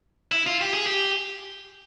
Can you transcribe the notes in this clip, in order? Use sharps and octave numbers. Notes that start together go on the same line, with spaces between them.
E4
F4
G4
G#4
G4